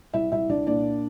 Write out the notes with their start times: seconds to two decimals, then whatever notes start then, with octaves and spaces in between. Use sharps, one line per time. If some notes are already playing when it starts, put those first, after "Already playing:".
0.13 C2 E4 E5
0.32 C2 E4 E5
0.49 C2 D4 D5
0.67 A#2 D4 D5